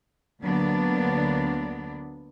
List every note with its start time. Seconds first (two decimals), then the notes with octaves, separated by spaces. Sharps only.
0.41 D2 D3 F#3 A#3 B3 D4